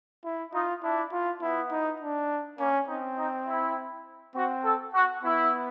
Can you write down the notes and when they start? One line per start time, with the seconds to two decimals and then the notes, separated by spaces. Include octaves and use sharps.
0.24 E4
0.53 D#4 F4
0.83 D4 E4
1.12 F4
1.42 B3 E4
1.71 D#4
2.00 D4
2.58 A#3 C#4
2.88 C4 D#4
3.17 D#4
3.47 E4
4.35 C4 F#4
4.64 A4
4.94 F#4
5.23 B3 E4